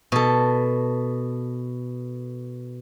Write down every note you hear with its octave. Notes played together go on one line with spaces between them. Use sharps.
B2 A4